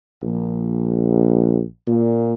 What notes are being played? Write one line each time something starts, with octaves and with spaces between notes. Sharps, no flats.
A#1
A#2